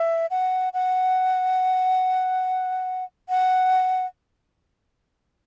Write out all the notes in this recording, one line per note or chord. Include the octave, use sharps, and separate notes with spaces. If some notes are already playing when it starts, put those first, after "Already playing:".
Already playing: E5
F#5
F#5
F#5